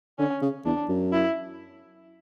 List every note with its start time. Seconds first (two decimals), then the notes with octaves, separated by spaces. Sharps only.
0.19 D3 C#4
0.42 C#3
0.65 E2 D4
0.89 F#2
1.12 E4